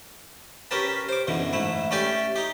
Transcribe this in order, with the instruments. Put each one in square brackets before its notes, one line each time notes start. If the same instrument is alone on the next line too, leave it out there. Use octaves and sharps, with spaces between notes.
[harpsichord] C#4 G4 A#4 B4 A5
C5 D6
F#2 B2 D3 E3
G#2 A3 E4
A3 C#4 G4 D5 G5 G#5
D#4 G4